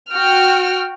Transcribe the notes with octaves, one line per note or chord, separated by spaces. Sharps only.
F#4 G5 F6